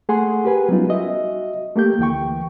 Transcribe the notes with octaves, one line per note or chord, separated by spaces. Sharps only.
A3 G#4 F#5 G#5 C6
G4 A#4 B4 G#5
F#3 G3 B3 C#4 D#4 F4
F#4 D#5 E5
A3 A#3 G4 G6
D2 E3 G5 C#6